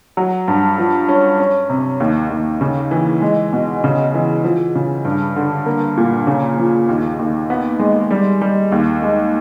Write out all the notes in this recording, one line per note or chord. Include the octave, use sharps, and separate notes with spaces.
F#3
G2
F3
C#4
C#4
C3
D#2
D#2
C#3
E3
G#3
B2
C#3
E3
F3
C#3
G2
D3
A#3
A#2
C#3
F3
D#2
D#2
B3
G#3
G3
G3
D#2
G#3